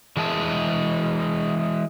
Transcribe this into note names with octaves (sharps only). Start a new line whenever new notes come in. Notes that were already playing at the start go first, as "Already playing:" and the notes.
E3 G#3 G#4 A5